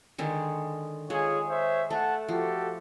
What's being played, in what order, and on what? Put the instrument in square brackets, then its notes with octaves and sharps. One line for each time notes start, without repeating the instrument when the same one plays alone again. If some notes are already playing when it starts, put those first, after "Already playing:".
[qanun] D3 D#3 G#3
[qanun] G#3 [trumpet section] F4 G#4 C#5
[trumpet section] C5 C#5 E5
[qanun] A3 [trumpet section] A4 F#5 A5
[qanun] F3 [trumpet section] F#4 G4 A4